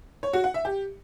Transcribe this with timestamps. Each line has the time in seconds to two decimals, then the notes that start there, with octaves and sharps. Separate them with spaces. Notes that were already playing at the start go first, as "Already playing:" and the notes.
0.23 C#5
0.33 F#4
0.44 F#5
0.54 E5
0.65 G4